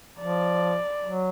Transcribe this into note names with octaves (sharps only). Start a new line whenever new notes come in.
F3 D5
F#3